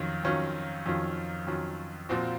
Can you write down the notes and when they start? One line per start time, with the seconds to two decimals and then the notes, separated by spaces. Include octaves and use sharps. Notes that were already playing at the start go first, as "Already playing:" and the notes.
Already playing: F2 D#3 F#3 C#4 F4
0.24 F2 D#3 F#3 C#4 F4
0.86 F2 D#3 F#3 C#4 F4
1.47 F2 D#3 F#3 C#4 F4
2.09 A#2 F3 C4 F#4